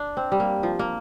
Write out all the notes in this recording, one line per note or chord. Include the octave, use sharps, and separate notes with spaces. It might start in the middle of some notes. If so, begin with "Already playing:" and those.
Already playing: D4
C4
G3
A#3
F3
A#3